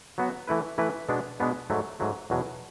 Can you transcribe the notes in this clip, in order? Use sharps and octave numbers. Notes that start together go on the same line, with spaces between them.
F#3 B3 F#4
E3 A3 E4 B4
E3 A3 E4 B4
B2 G#3 B3 D4
B2 G#3 B3 D4
G#2 F#3 A3
G#2 F#3 A3
E2 B2 F#3